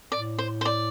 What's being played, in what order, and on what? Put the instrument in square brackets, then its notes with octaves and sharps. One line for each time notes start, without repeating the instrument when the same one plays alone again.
[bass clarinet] A2 [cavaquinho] D5
[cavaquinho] C5
C5
D5